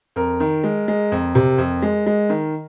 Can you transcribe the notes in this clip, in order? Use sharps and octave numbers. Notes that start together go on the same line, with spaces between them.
F2 A#4
D#3
G#3
G#3
F2
C3
F2
G#3
G#3
D#3